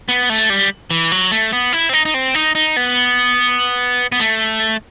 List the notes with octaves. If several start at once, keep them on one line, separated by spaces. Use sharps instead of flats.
B3
A3
G3
E3
F#3
A3
B3
E4
C4
D#4
D#4
C4
D#4
D#4
B3
B3
A3